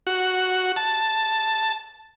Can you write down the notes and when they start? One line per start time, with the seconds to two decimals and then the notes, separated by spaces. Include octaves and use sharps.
0.07 F#4
0.76 A5